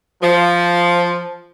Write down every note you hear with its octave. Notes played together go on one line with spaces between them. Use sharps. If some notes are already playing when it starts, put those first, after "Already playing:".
F3